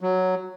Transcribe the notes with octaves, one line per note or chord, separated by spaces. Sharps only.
F#3